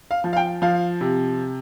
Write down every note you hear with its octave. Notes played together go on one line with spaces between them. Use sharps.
F5
F3
F5
G5
F3 F5
C3